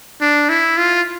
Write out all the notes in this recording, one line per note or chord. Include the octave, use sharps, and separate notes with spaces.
D4
E4
F4